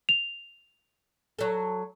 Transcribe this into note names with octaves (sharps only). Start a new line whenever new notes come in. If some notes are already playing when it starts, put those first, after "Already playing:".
F7
F#3 A4